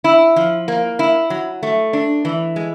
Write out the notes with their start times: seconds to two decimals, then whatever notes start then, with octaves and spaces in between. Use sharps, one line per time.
0.04 E4
0.36 F3
0.68 A#3
0.99 E4
1.30 F#3
1.63 A3
1.93 D4
2.25 E3
2.56 G#3